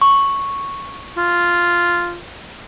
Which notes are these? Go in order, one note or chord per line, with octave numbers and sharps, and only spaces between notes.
C#6
F4